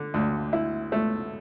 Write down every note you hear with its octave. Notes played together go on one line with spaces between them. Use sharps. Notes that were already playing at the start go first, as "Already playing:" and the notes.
Already playing: D3
D2
E4
A3